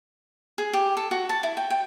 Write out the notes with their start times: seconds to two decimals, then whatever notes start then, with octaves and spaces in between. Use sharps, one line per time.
0.58 G#4
0.73 G4
0.97 A4
1.11 F#4
1.29 A5
1.43 E4
1.57 G5
1.70 G5